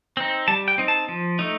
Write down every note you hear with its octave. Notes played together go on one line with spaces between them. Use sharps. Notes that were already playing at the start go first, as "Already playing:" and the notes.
C4 D#4
G3 A5
G5
C4 D#4
A5
F3
A3 D#4